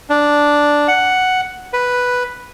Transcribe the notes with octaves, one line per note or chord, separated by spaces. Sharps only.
D4
F#5
B4